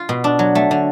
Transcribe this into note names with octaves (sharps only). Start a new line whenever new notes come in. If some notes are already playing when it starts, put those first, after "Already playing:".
Already playing: F4
B2
D4
F#3
A3
D3